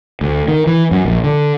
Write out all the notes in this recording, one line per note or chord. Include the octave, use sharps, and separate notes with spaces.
D2
D#3
E3
F#2
A#1
D3